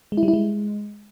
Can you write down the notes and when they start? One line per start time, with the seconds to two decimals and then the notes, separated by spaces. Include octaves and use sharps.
0.12 G#3
0.17 E4
0.23 G3
0.28 E4
0.33 G#3